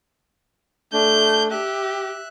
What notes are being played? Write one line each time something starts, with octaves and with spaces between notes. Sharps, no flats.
A3 D4 G6
G4 E5 F#6